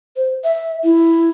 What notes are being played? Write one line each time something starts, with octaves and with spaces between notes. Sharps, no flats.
C5
E5
E4